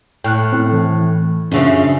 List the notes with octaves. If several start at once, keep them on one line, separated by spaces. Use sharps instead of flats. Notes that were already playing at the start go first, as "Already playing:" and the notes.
A2 G5 F6 F#6
C4 E4 A4
E3
F#2 C#3 F3 C#4 D4 E5